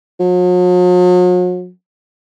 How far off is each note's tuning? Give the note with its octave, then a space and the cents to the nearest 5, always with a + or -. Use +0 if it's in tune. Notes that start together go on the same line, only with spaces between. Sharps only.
F#3 -45